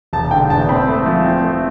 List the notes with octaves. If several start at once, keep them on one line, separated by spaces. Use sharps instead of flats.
E1 A5
D3 G5
E2 A5
C4 B5
A3
F3
C4
A3